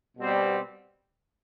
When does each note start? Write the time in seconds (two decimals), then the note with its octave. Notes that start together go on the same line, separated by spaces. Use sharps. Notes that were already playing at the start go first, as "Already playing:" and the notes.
0.17 B2 G3 C4